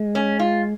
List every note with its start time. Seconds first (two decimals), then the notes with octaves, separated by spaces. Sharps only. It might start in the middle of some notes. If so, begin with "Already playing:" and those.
Already playing: G#3
0.15 C#4
0.39 F4